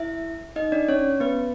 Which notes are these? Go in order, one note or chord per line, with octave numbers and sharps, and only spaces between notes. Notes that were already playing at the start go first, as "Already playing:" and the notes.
Already playing: E4 E5
D#4 D#5
D4 D5
C#4 C#5
B3 B4